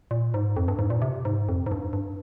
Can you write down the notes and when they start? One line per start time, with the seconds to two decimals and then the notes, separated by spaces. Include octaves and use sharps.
0.11 A#2
0.34 G#2
0.57 F2
0.68 G2
0.79 G#2
0.90 A#2
1.02 C3
1.25 G#2
1.49 F2
1.66 G#2
1.71 G2
1.93 G2